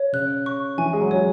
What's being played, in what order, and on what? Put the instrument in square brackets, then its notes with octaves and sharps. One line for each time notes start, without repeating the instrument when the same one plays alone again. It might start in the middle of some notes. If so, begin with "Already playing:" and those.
Already playing: [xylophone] C#5
[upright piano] C#3 [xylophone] F#6
[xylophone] C#6
[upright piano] E3 [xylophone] G#5
[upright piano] G#3
F#3
[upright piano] G#3 [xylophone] C#5